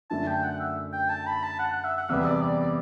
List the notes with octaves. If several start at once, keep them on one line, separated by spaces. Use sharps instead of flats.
F#2 D3 A3 A5
G5
F#5
E5
G5
A5
B5
A5
F#5
F#5
E5
F#5
E2 C3 G3 B3 E5
D5
D5
D5